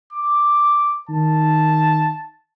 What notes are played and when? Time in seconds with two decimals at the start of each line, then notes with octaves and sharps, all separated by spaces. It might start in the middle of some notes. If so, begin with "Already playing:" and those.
0.13 D6
1.09 D#3 A5